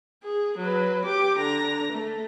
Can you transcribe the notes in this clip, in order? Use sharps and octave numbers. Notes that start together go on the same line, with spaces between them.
G#4
F#3 B4
G4 D6
D3 A#5
A3